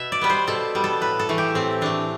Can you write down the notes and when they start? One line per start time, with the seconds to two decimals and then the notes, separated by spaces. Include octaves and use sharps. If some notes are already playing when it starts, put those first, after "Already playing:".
Already playing: B2 E5
0.12 D5
0.21 G3 B3 B4
0.30 C5
0.48 B2 A4
0.75 G3 B3
0.84 A4
1.01 A2 B4
1.19 A4
1.29 E3 A3
1.38 G4
1.55 A2 C4
1.81 E3 A3 D4